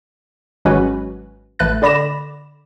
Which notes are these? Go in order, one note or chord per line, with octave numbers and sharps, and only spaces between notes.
G#1 F#3 G#3 C#4 F#4 B4
A1 A3 B4 F#6 A6
D3 D5 B5 D6 A#6 E7